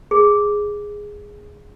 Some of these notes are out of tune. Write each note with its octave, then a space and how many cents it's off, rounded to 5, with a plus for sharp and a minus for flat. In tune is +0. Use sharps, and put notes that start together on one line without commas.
G#4 -5